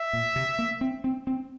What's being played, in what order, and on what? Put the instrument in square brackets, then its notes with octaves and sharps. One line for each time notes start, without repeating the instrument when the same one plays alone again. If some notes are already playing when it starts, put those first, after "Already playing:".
Already playing: [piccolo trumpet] E5
[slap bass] A#2
C3
A#3
C4
C4
C4